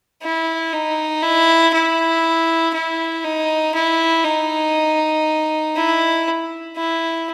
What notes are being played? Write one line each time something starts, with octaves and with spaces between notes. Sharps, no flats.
E4
D#4
E4
E4
E4
D#4
E4
D#4
E4
E4